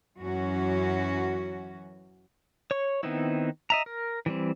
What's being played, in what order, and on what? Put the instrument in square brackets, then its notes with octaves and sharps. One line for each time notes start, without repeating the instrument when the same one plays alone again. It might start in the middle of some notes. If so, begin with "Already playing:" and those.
[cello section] F#2 E3 C#4 F#4
[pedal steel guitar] C#5 C#6
D#3 B3 C4 D#4 E4
D#5 E5 A#5
A#4
E3 G3 C4